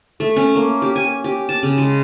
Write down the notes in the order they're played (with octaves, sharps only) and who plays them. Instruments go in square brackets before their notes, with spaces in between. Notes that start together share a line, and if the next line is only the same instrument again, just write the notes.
[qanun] A3
C#4
A#3
G4
G#5
G4
A5
C#3
G#3